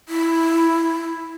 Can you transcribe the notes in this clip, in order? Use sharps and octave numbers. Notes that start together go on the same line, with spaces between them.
E4